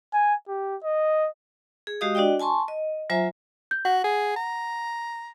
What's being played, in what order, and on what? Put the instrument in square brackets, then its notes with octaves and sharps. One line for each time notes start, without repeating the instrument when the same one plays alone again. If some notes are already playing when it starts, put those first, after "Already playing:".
[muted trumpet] G#5
G4
D#5
[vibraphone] G#4
G#3 F#4 G4 D#5 F5 D#6
D4 F#4 D5 D#5 G5
G#5 A5 C6 C#6
D#5
F#3 F4 C5 E5 G#5 A#5
[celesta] G6
[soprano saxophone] F#4 [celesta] F#5
[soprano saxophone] G#4
A#5